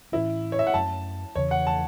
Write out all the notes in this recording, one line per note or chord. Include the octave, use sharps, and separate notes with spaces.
A2 E3 C#4 E4
C#5
E5
F#5
F#2 F#3 A3 C#4 A5
E2 C#3 E3 C#5
F#5
A5